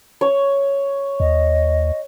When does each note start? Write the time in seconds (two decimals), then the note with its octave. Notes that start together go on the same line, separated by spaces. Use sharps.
0.21 C#5
1.20 D#2 D#5